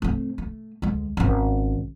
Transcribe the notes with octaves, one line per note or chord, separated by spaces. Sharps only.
A3 C4
A3
D2 G#3
G#1 C#4